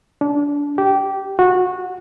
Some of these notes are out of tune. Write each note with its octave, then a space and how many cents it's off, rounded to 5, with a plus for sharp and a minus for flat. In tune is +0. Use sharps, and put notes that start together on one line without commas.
D4 -25
G4 -15
F#4 -20